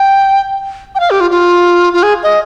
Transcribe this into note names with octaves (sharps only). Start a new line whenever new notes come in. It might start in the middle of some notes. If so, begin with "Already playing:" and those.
Already playing: G5
G5
F5
G4
F4
F4
F4
G#4
D#5